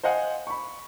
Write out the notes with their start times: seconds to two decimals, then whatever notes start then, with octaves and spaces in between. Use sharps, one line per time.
0.03 C5 D#5 F5 F#5 G#5
0.47 B5 C#6